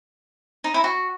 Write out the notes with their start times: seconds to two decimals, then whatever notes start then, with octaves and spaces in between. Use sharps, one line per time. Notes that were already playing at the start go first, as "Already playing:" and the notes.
0.64 D#4
0.74 E4
0.84 F#4